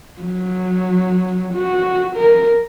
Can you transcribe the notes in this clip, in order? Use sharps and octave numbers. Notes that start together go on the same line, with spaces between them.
F#3
F#4
A#4